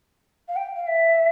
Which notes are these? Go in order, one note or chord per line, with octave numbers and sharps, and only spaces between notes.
F5
G5
F5
E5